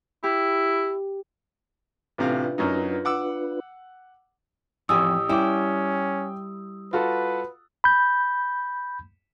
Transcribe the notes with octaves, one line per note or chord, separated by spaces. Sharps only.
E4 G4
A1 C3 D4 F4 B4 F5
F#2 F#3 D#4
F#5 D6 E6
A1 F2 G4 G#5 D#6 E6
G3 C#4 E4 G5 D6
F4 F#4 A4 B4
B5 G6